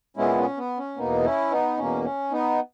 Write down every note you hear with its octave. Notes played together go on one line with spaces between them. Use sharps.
A#2 G#3 B3 C#4 E4
C#4
B3
C#4
E2 B2 A#3 B3 D#4
C#4 E4
B3 D#4
E2 B2 A#3 C#4
C#4
B3 D#4